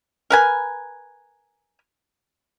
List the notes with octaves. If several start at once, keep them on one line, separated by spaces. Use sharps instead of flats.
A#4 B4 G#5